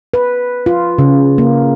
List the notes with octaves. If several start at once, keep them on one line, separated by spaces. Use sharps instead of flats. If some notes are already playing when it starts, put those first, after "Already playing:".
B4
F4
C#3
A#3